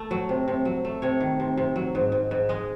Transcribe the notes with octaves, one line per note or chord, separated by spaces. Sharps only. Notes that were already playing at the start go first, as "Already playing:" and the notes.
Already playing: A3
F#3
C3
C3
F#3
A3
C3 C#5
D#3
C3
C3
F#3
G#2
G#2
G#2
G#3 D#5